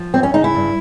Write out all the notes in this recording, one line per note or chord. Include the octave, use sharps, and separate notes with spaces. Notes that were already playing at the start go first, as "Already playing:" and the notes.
Already playing: F3
F#2 C4
C#4
C#3 D#4
E4
G2